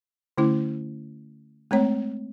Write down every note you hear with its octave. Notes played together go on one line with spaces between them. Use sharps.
D3 A3 C#4 E4
G#3 A3 C4 C#5